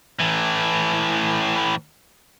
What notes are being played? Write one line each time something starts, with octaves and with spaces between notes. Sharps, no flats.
A2 E3